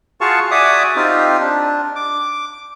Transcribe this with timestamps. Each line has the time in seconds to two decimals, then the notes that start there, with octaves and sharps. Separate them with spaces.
0.21 F4 F#4 G#4 F5 A5 C#6
0.51 F#4 D5 E5 G#5 D6 D#6
0.96 C4 D#4 F4 G4
1.40 D4
1.95 D6